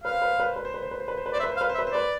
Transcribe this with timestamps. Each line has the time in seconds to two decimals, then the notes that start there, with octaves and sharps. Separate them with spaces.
0.04 B4 F5
0.13 C5
0.22 B4
0.30 C5
0.40 B4
0.48 C5
0.56 B4
0.65 C5
0.74 B4
0.82 C5
0.91 B4
1.00 C5
1.08 B4
1.17 C5
1.26 B4
1.33 C5 D5
1.40 E5
1.43 B4
1.52 C5
1.57 F5
1.61 B4
1.69 C5
1.74 E5
1.79 B4
1.87 C5
1.91 B4 D5